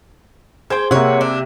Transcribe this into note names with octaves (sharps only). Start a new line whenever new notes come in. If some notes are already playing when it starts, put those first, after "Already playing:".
G#4 C5 G5 G#5 C6 G#6
C3 A#3 G4 C#5 E5 F#5
D4